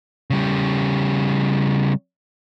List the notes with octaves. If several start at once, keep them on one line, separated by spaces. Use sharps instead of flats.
C#3 G3